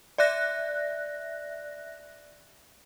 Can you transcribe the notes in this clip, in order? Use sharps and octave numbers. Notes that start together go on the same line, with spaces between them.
D5 E5 F#6 A#6